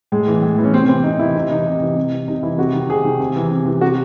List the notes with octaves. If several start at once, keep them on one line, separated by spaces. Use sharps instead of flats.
A2 G#3
E3
A2
E3
C#4
C3 C4
E3 C4
C3 D#4
E3 E4
C3 D#4
E3 D#4
C3
E3
C3
E3
C3 D#4
E3 E4
C3 F#4
D#3
C3 G#4
D#3
C3
E3
C3
E3
C3 F#4